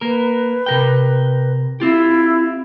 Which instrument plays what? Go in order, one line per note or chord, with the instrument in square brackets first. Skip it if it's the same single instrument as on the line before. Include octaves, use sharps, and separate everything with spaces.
[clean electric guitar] A#3 A#4 [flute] B4
[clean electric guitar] C3 A#4 G5
[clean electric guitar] C4 F4 G4 [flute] E4